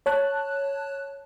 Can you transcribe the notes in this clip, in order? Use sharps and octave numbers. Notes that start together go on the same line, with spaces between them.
C#5 A5 F#6